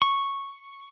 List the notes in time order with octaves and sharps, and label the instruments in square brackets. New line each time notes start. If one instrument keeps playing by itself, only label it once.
[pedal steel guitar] C#6